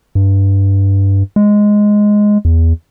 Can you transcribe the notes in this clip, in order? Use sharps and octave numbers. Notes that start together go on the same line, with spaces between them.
G2
G#3
E2